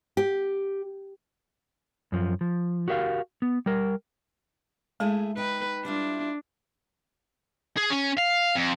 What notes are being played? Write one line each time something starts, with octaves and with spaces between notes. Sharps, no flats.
G4
F#2 F3
F3
F#4 G4 A#4 E5 F5
B3
G3 A#4
G#3 A3 E4 G#4
D#4 B4 G5
G3 D4 E4 F4
G#4
C#4
F5
F2